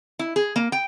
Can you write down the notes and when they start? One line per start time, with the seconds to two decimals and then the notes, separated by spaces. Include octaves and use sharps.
0.19 E4
0.36 G#4
0.56 A#3
0.72 G5